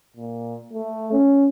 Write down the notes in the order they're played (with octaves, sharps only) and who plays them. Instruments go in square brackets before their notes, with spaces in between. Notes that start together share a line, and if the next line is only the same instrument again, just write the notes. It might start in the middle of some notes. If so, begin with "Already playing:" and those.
[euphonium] A#2
A3
C#4